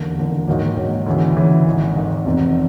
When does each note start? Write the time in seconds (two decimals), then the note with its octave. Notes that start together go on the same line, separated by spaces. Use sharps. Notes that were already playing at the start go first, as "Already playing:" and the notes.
Already playing: E1 D#2 D3
0.18 E1 D#2 D3
0.47 G#2 D#3 F#3 A#3
0.77 G#2 D#3 F#3 A#3
1.06 D2 C#3 E3
1.36 D2 C#3 E3
1.67 G#1 G#2 D#3
1.96 G#1 G#2 D#3
2.25 F1 E2 C3